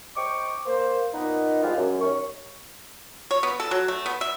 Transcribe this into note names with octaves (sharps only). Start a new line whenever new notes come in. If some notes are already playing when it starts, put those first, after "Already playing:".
C5 D#5 G5 C#6 D6
A#3 C5
A#2 B3 D#4
G2 F3 G#3 B3 F4 G4
F#2
D#2 C#4 C#6
C#5
B3
A4
F#3
A3
B3
E5